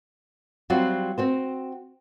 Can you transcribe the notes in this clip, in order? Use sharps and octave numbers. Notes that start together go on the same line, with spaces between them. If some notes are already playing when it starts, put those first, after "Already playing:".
F#3 G3 C4 F4 F#4
C4 F#4 C5